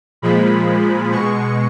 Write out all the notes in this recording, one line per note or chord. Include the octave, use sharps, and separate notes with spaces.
A#2 F3 G#3 B5
B2 G#3 C#6